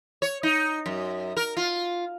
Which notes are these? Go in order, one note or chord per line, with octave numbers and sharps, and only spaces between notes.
C#5
D#4
F#2
A#4
F4